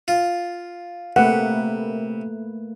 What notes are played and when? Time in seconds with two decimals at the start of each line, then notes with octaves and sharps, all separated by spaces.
0.08 F4
1.16 C3 A3 A#3 B4 F#5